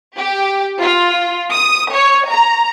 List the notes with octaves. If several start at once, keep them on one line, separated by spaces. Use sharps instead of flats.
G4
F4
D#6
C#5
A#5